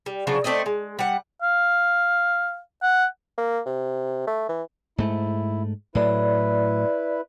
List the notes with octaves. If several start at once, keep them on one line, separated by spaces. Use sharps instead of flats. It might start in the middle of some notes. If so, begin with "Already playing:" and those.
G3
C#3 F3 F#3 D4
A3 C4 D5 D#5
G#3
G3 F#5
F5
F#5
A#3
C3
A3
E3
G#2 A3 E4
A2 F#3 E4 B4 D5